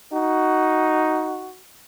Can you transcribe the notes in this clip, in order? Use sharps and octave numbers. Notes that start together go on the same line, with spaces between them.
D#4 F#4